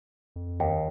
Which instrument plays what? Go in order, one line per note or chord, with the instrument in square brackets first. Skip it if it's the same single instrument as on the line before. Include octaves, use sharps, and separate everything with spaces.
[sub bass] F2
[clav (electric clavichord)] D#2 [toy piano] G5